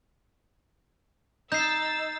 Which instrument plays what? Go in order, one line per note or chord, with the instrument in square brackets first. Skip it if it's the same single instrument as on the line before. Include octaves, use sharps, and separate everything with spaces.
[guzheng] D#4 [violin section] E6 A6 [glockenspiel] G6 C7